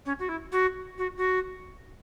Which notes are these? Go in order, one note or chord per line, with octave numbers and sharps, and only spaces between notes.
C#4
F#4
E4
F#4
F#4
F#4